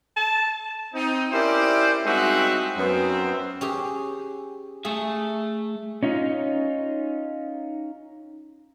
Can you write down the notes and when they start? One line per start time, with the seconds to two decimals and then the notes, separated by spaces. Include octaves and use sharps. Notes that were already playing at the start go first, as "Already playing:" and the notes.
0.17 A5
0.94 C4 D#4
1.31 C#4 E4 G4 A#4 C5 D5
2.05 G3 G#3 C4 D#4 F#4 E5
2.78 F#2 B3 C4
3.61 C#4 G4 G#4
4.85 A3 G#4 E5
6.03 C#4 D#4 F4